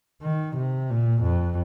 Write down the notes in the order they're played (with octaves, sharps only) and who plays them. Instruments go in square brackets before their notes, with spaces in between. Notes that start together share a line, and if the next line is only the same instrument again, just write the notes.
[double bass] D#3
C3
A#2
F2